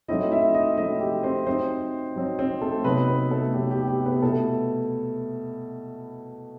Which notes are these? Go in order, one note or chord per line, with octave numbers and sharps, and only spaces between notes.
F#3 A3 C4 D#4 E4 D#5
E4 E5
D#4 D#5
F#3 A3 C4 D#4 E4 D#5
G4
C4 C5
F#3 C4 D#4 C5
F#3 C4 D#4
C4 C5
A3 A4
C3 F#3 B3 D#4 B4
B3 B4
A3 A4
C3 F#3 B3 D#4 G4
G4
G4
B3 B4
B2 A3 E4 A4